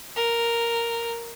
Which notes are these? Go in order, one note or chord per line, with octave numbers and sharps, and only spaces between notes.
A#4